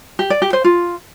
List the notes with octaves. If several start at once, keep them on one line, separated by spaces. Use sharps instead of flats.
G4
D5
G4
C5
F4